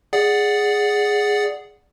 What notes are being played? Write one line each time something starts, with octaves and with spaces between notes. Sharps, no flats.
G#4 D5 F#5